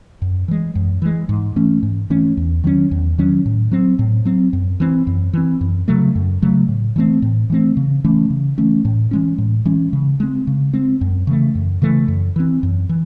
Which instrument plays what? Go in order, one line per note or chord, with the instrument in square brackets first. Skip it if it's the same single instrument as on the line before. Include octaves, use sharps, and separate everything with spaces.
[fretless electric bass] F#2
E3 G#3
F#2
E3 G#3
G#2
E3 A3 C#4
G#2
E3 A3 C#4
E2
D#3 F#3 C#4
E2
D#3 F#3 C#4
A2
F#3 C4
A2
F#3 C4
F#2
E3 C4
F#2
E3 C4
F#2
C#3 F#3 A3
F#2
C#3 F#3 A3
A2
E3 A3 C4
A2
E3 A3 C4
C#3
E3 A3 C#4
C#3
E3 A3 C#4
A2
E3 G#3 C#4
A2
E3 G#3 C#4
C#3
G#3 C4
C#3
G#3 C4
F#2
C#3 E3 A3
F#2
C#3 E3 A3
F#2
E3 C4
F#2
E3